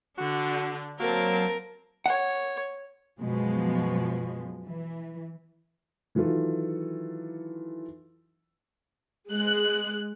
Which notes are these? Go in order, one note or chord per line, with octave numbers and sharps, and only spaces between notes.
D3 D4 F#4
F#3 A#3 C4 A#4 A5
C#5 F#5
F#2 B2 F3 G#3
E3
D#3 E3 F#3 F4 A4
G#3 F#6